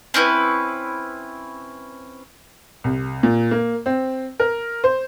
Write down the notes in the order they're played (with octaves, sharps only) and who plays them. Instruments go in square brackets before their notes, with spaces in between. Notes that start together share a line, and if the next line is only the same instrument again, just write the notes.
[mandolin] C4 C#4 E4 B4
[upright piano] C2
A#2
A#3
C4
A#4
C5